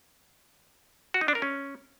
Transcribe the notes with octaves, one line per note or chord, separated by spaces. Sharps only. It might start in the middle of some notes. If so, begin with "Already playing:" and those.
F#4
D#4
D4
A#4
C#4